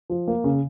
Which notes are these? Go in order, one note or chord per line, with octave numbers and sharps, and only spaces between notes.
F3
A#3
C#3